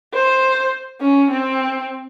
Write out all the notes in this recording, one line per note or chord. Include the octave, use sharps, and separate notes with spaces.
C5
C#4
C4